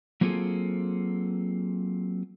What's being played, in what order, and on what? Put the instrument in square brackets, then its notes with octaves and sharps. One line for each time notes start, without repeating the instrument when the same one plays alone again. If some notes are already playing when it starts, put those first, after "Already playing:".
[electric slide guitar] F#3 A#3 C4 F4 G#4 A4